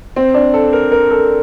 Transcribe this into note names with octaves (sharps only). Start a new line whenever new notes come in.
C4
D4
A4
A#4
A#4
A4